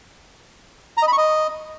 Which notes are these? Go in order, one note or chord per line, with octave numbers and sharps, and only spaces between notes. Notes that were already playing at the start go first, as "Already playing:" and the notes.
A#5
D#5
B5
C#6
D#5